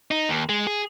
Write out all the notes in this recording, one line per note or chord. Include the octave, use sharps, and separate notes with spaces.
D#4
D#2
G#3
G#4